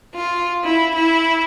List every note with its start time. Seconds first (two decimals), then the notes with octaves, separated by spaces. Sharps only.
0.16 F4
0.64 E4
0.95 E4